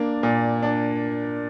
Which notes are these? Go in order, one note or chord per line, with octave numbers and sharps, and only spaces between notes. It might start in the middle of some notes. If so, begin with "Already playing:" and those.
Already playing: A#3 D4
A#2
D4